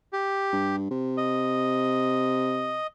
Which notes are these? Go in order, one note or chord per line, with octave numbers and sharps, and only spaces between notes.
G4
G2
C3
D#5